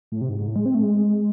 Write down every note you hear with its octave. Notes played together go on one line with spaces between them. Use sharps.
A2
C3
G#2
G#2
A2
G#3
C4
A3
G#3